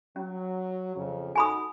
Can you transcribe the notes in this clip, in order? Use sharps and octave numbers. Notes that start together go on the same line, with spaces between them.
F#3 C#4
F2 C#3
D#4 F#4 A4 G#5 B5 D#6